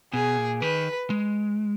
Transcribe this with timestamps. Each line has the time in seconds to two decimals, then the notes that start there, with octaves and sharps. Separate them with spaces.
0.13 B2 G#4
0.37 A#2
0.62 D#3 B4
1.10 G#3